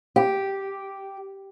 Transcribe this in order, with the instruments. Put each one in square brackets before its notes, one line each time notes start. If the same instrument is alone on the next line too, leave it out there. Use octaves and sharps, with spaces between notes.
[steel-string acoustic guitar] G4